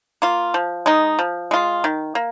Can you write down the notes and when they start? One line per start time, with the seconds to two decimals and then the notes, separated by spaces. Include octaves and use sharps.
0.22 A#3 F4
0.54 F3
0.86 G#3 D#4
1.19 F3
1.51 G#3 F4
1.84 D#3
2.15 A#3